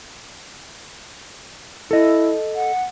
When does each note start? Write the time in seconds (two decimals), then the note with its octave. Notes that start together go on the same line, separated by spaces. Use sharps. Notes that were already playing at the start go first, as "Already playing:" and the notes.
1.91 E4 A4 D#5
2.55 F#5